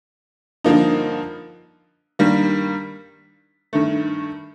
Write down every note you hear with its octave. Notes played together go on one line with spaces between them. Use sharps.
G2 D3 F3 A#3 D#4
G2 D#3 G3 A#3
G2 D#3 A3